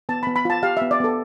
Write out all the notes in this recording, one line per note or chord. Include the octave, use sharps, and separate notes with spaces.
B3 A5
B5
B3
B5
F4 A5
G4 F5
B3 E5
D5
B3 A4